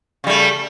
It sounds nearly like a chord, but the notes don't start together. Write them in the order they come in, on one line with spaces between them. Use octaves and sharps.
C#3 G3 A3